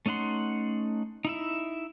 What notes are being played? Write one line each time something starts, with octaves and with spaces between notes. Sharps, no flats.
A3 C#4 D#4 F#5 C6
D#4 E4 E5